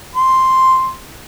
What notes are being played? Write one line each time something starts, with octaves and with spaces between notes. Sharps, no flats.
C6